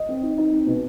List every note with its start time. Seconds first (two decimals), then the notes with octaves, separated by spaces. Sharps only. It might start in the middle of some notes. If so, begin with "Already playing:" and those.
Already playing: D#5
0.08 C4
0.22 D#4
0.38 D#4
0.52 C4
0.67 B2